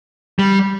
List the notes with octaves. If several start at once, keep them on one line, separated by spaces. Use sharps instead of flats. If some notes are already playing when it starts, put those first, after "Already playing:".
G3